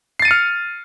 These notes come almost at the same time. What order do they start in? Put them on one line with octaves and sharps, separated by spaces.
C7 A6 D#7 C#7 F6